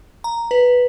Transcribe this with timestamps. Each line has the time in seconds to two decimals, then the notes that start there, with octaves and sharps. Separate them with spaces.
0.24 A#5
0.51 B4